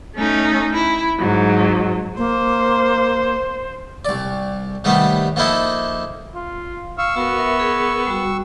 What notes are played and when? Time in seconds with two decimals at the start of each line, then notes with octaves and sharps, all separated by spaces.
0.15 A3 C#4 D#4
0.73 E4
1.17 G#2 F#3
2.18 A#3 C5
4.05 C2 D5
4.84 C3 D#3 G3 A3 B3
5.36 F3 A#3 D#4 E4 A4
6.35 F4
6.98 F5 C#6 E6
7.16 B3 F#4 A#4
7.38 A#4 E5
7.60 G#4 A#4 B4
8.07 G3 F#4